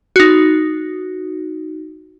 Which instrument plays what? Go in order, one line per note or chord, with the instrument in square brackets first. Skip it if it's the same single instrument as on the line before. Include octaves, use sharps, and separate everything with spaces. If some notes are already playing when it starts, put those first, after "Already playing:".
[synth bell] D#4 F#4